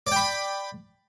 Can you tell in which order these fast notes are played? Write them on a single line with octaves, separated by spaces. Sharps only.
D5 G5 B5